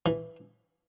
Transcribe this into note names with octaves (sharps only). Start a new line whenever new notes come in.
E3